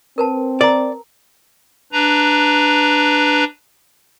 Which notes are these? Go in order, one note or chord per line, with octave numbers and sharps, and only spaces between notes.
C4 A#4 B4 A5
A#4 D5 A#5
D4 B4 A#5